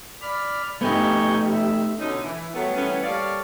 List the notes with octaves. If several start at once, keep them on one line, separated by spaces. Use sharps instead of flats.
D5 B5 F6
A3 B3 D#4 G4 G#5 C#6 G6
E5
B2 D3 C#4 D#4
E3
F#3 G3 A3 B3
E3 G3 A3 B3 C#4
G3 A#3 A4 C#5 D5 F5